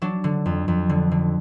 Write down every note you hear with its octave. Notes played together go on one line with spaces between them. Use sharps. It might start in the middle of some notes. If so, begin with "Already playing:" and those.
F#3 D4
D3
F2
F2
D3
D3